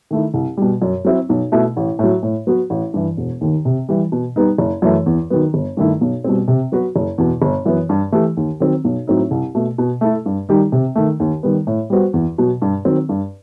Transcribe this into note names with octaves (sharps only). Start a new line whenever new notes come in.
D#3 A3 E4
C2
B2 G3
F#2
F#3 C4 E4
B1
B2 A3 E4
A1
A2 F#3
A2
F#3 B3 F#4 B4
A1
G2 E3
E1
D#2 D#3
C3
E3 G3
B2
G3 B3 D#4
F#1
F#2 E3 A3
E2
D#3 F#3 B3
G1
G2 D#3 A3 E4
B1
B2 G3 C4
C3
F#3 B3 F#4 B4
F#1
E2 B2
G1
F#2 E3 B3
G2
E3 A3 E4 G4
D#2
D#3 F#3 C4
B1
A2 F#3 C4 D#4
C2
B2 A3
B2
A3 E4 A4
G2
D#3 G3 D#4 G4
C3
D#3 A3
D#2
D#3 G3 B3
A2
G3 B3 F#4 C5
E2
B2 F#3
G2
D#3 F#3 C4
G2